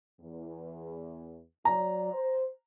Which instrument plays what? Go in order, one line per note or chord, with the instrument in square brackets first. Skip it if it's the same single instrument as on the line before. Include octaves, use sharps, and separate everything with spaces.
[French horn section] E2
[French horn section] F#3 D5 [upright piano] A#5
[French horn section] C5